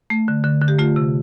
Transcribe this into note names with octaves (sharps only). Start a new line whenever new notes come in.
A3
D3
D3
D3
G4
A3 F4
C3